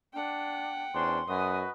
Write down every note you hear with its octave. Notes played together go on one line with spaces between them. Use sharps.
D4 F#5 G5
E2 C#4 D4 C5 C6
F#2 F#4 B4 D#5 G#5 D#6